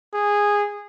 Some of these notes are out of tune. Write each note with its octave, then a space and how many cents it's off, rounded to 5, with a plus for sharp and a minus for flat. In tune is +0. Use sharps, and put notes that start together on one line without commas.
G#4 -15